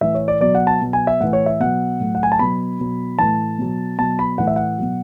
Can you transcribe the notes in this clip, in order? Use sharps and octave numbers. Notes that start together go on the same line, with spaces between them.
A2 E3 E5
C#5
D5
B2 F#3 D5
F#5
A5
B2 F#3
G#5
E5
A2 E3 F#5
C#5
E5
B2 F#3 F#5
A2 F#3
F#5
G#5
A5
B2 F#3 B5
B2 F#3
A2 E3 A5
B2 F#3
B2 F#3 A5
B5
A2 E3 F#5
E5
F#5
B2 F#3